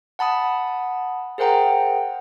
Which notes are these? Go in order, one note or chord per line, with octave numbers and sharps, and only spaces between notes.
F#5 A5 B5 D#6
G#4 A#4 C5 F#5 G5 A#5